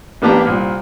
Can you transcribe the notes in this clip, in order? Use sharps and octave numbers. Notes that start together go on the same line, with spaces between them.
A1 A#3 B3 D4 G4 A#5
C2 A#2